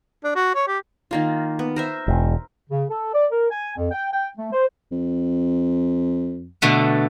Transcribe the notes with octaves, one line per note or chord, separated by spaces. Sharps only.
D4
F#4
C#5
G4
D#3 A#3 F4
B3
A#4 C5 E5
E1
C#3
A4
D5
A#4
G#5
F2
G5
G5
A3
C5
F2
B2 D3 A3